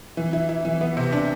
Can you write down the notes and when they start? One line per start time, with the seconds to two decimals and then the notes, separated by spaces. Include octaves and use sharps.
0.17 E3
0.33 E4
0.49 E4
0.65 E3
0.81 B3
0.97 C3
1.12 D4